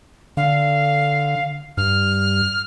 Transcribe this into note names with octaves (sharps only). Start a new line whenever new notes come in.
D3 F5
G2 F6